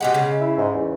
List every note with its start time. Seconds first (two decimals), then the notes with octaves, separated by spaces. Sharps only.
0.01 B2 G#3 G4 F#5
0.14 C#3
0.41 E4
0.58 G#2
0.74 E2